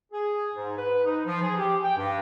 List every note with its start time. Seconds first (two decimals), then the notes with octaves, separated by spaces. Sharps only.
0.12 G#4
0.53 G#2
0.77 B4
1.04 D#4
1.26 F3
1.42 G#4
1.58 G4
1.83 G5
1.97 G2